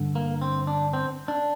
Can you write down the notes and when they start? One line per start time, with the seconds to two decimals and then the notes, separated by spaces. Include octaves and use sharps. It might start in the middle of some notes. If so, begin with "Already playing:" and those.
Already playing: G2 D3
0.15 A#3
0.41 C4
0.67 D4
0.93 C4
1.28 D4